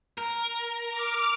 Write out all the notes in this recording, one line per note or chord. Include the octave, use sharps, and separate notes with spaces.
A#4
D6 F6